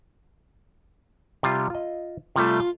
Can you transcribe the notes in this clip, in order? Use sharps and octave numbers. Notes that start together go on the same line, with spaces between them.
C3 G3 F4
F4 D#5
C3 G3 A3 F4